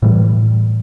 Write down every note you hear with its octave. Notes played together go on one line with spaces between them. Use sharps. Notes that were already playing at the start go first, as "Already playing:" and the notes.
A2 E3 G3